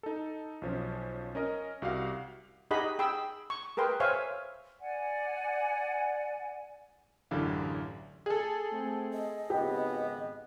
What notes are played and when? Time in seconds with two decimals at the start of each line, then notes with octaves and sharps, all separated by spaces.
0.03 D#4 A4
0.62 B1 F3 C#4
1.35 C#4 A#4 D#5
1.82 C2 F#4 G4 F5
2.71 D#4 G4 G#4 D#5 F#5 B5
2.99 G#4 G5 B5 E6
3.50 C#6
3.77 G#4 A#4 B4 G5 C6
4.00 C5 C#5 E5 F5 G#5 C#6
4.81 D5 F#5 G#5
7.31 A1 F#2 D3 E4 G4 F5
8.26 G#4 A4
8.72 A3 C4
9.13 D#5
9.50 G#1 C#3 B3 G4